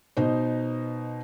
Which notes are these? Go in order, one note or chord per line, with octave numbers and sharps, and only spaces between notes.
B2 D#4 C5